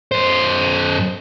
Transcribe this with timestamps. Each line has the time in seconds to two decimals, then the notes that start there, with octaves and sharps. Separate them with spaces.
0.12 F#2 C5